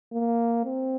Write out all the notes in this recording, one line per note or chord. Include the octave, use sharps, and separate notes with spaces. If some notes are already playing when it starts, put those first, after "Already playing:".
A#3
C4